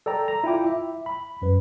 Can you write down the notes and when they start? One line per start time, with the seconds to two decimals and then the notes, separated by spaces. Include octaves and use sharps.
0.06 A4 D5 G5 A#5
0.28 A#5
0.44 E4 F4 G5 D6
0.67 E5
1.06 B5
1.42 F#2 B4